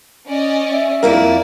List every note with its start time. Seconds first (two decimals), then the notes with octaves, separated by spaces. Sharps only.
0.27 C#4 D5 D#5
0.73 E5
1.03 F2 A#3 E4 A#4 D5